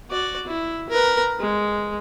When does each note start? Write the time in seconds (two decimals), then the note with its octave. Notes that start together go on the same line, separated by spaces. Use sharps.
0.10 F#4 D5
0.47 E4
0.89 A#4 B4
1.39 G#3